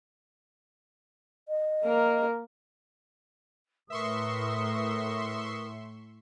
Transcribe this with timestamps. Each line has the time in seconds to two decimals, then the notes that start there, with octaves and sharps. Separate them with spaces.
1.49 D#5
1.84 A#3 A#4
3.90 A2 A#4 B4 E5 C6 C#6 D#6